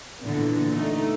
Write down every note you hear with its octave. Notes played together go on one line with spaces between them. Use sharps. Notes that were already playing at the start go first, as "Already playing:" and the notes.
A#2 D3 E3 B3
A3 D#4